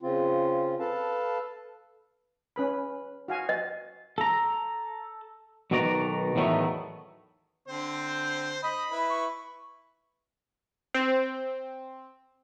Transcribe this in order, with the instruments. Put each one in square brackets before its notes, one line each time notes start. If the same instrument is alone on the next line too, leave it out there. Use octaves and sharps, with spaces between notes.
[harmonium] C#3 C4 F4
A4 B4 F5 A5
[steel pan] C#4 B4 B5
F#4 F5 G#5
[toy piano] D#5
[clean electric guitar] A4 A#5
B1 B2 D#3 F#4 D5 A#5
E2 A2 D#3 F#3 A3 B3
[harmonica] D3 C4 C5
[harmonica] D#5 [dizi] B5
[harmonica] E4 B4
[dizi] C#6
[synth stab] C4